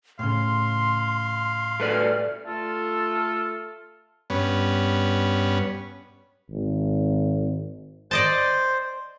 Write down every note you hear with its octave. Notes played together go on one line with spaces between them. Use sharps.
A2 C#3 F5 C6
A3 B4 D5 F6
A3 F4 A4
G2 B3 C#4
G#1
C5 D5 D#5 A5